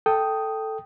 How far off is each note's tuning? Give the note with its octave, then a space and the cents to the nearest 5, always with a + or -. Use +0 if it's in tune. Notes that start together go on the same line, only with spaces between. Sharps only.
A4 +0 G5 +0 D#6 +0